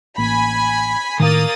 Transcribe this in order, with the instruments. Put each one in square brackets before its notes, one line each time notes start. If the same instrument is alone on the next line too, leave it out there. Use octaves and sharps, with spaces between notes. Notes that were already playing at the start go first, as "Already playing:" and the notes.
[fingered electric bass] A1 A#3 [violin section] G#5 B5
[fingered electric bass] A2 D#3 [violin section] A#3 D#6 A6